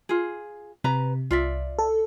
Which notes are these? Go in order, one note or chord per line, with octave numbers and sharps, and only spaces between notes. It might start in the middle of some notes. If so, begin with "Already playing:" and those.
F4 G#4
C3 B4 A#5
C2 F4 D5 E5
A4